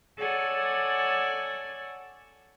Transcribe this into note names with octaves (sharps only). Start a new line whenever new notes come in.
A4 C#5 D5 F#5 G#5